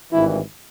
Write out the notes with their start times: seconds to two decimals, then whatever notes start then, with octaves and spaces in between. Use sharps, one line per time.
0.11 G#1 G2 E3 E4